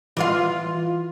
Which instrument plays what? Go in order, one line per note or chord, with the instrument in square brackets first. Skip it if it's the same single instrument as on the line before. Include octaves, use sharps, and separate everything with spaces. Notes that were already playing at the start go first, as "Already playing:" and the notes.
[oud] E3 F4 F5